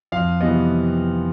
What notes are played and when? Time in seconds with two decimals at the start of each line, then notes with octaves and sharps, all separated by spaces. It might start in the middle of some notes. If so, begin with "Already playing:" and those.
0.12 F2 F5
0.41 C3 E3 G3 B3 D#5